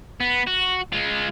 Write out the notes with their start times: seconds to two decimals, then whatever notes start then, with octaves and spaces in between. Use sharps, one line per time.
0.20 B3
0.47 F#4
0.93 G#3 F4